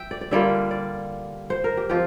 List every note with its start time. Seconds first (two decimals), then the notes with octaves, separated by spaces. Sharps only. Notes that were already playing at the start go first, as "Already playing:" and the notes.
Already playing: E5 G5
0.11 D5
0.21 D5
0.31 D3 G3 A#3 F4 E5
0.71 D5
1.50 C5
1.64 A#4
1.77 G4
1.90 F3 C4 F4 G4